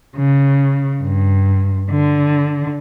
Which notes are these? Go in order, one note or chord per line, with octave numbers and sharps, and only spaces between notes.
C#3
G2
D3